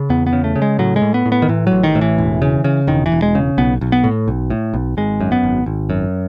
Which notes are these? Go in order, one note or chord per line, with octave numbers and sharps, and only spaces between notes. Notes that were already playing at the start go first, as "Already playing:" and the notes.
Already playing: C#3
E2 B3
B3
C#3
A3
C#3
G#3
A2 F#3
G#3
A2
B3
A2
B3
D#3
A2 E3
A1 F#3
D#3
A2
E3
E1
C#3
C#3
E1 D#3
E3
E1
G#3
C#3
B1 B3
B1
B3
A2
B1
A2
B1
G#1 G#3
F#2
B3
G#1
G#1
F#2